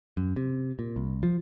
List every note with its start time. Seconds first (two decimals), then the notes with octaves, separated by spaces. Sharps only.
0.17 F#2
0.36 C3
0.79 A#2
0.96 C2
1.23 F3